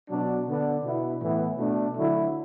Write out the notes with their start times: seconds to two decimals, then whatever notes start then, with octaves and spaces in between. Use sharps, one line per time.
0.09 B2 F#3 D4
0.48 D3 B3 D4
0.84 B2 B3 E4
1.22 A2 E3 B3 E4
1.58 B2 A3 D4
1.96 D3 F#3 A3 E4